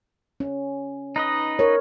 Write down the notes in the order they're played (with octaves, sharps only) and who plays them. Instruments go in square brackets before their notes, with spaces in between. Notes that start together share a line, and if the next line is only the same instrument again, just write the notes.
[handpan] C#4
[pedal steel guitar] D#4 B4 D#5
[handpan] A#4 C#5